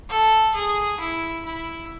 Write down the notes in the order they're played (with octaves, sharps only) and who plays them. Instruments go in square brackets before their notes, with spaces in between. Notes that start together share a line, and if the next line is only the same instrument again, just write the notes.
[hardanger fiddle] A4
G#4
E4
E4